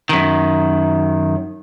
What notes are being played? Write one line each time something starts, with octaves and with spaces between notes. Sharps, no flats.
F#2 D#3